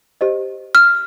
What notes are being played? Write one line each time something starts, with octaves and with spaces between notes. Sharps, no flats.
G4 C5 D#5
F6